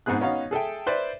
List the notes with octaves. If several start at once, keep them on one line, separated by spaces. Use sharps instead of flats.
G#2 B3 C4 G#4 F#6
B3 C#4 D#4 F#4 F5
G#4 A4 E5 G5
B4 C5 D5 E5